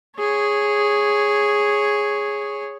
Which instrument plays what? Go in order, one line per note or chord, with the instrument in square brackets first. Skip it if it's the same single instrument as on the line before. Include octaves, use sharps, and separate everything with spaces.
[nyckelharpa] G#4 C#5